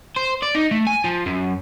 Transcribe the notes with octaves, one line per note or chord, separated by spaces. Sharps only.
C5
D5
D#4
A3
G#5
F3
F#2